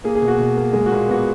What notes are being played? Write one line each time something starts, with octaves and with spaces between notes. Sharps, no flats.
A#3 G#4
G#4
B2
F#4
B2
A#3
G#3 G#4
F#4
A#2
B3 F#4